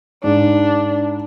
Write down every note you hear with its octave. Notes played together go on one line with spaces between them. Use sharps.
G#2 D4